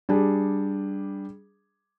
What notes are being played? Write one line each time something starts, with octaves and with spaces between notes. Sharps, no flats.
G3 D4 G#4